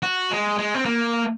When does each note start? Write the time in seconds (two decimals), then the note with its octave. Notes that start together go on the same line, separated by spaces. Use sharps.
0.03 F#4
0.31 G#3
0.58 G#3
0.75 C4
0.85 A#3